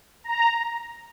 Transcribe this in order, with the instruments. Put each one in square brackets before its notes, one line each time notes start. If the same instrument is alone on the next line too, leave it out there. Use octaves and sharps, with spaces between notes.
[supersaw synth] A#5